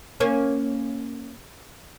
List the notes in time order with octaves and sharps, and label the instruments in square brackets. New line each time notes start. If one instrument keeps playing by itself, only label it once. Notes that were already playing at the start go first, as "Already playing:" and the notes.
[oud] A#3 C#4